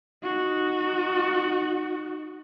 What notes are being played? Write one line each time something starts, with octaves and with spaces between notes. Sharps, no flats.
D#4 F#4